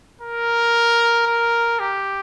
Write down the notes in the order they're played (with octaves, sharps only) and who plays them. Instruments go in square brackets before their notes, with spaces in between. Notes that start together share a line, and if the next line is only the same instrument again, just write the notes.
[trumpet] A#4
A#4
G4